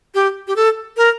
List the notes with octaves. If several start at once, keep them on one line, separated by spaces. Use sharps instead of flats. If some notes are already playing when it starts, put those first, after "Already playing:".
G4
G4
A4
A#4